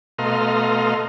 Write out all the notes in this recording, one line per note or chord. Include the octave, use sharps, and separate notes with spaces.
B2 A3 D#5 F5 A#5 C6